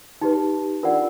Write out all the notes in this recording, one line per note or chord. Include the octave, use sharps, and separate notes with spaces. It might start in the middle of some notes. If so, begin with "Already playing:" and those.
D#4 G4 B4
D4 F4 A#4 D5 F#5